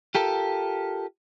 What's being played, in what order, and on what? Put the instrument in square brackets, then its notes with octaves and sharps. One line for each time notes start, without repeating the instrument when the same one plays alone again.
[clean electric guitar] F4 G4 A4 A#4